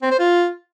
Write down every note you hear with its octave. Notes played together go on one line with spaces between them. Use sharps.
C4
C5
F4